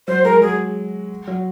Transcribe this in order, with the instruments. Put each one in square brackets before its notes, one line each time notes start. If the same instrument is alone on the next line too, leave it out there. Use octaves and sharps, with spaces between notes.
[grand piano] F#3 [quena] C5
[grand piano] G#3 [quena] A#4
[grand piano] F#3 [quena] G#4
[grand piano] F#3